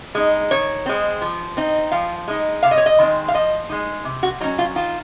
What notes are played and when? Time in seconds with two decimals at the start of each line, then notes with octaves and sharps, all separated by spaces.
0.15 G#3 D#4
0.51 D#3 C#5
0.86 G#3 C4
1.21 F3
1.57 C4 D#4
1.92 F3 F5
2.28 G#3 D#4
2.63 C3 F5
2.71 D#5
2.77 C#5
2.86 D#5
2.99 D#3 G#3 C4
3.28 F5
3.34 F3 D#5
3.69 G#3 D#4
4.05 C3
4.23 F#4
4.41 F#3 C#4 D#4
4.58 F4
4.75 D#3 F4